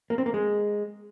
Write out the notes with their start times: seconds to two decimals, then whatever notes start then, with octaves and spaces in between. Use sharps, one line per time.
0.10 A#3
0.18 C4
0.26 A#3
0.34 G#3